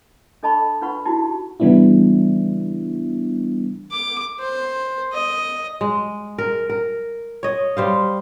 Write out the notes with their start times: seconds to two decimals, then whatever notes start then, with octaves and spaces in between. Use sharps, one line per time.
0.43 D4 A4 D#5 A5 B5 C#6
0.82 D4 F4 B4 F#5 B5 C#6
1.05 D#4 E4 F#4 G4 G5 A5
1.60 C#3 E3 G3 B3 D4 E4
3.91 D6
4.40 C5
5.13 D#5
5.81 G#3
6.38 A#4
6.70 A#4
7.43 C#5 D#5
7.77 G3 C5 F5